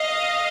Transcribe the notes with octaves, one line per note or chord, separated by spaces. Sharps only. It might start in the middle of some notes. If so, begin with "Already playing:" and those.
Already playing: D#5 F5